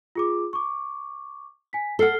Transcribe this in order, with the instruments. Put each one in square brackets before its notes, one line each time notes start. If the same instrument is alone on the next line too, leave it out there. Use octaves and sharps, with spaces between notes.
[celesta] F4 G#4 D6
C#6 D6
G#5 B6
[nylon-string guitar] A4 F#5 [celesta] F6 C7 G7